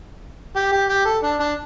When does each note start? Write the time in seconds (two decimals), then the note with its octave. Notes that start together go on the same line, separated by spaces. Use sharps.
0.56 G4
0.72 G4
0.89 G4
1.06 A4
1.23 D4
1.40 D4